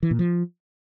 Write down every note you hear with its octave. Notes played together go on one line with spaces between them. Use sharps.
E3
A#2
F3